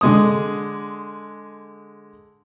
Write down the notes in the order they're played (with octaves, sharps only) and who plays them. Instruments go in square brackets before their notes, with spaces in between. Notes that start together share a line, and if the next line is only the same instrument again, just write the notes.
[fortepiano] D3 G#3 D#6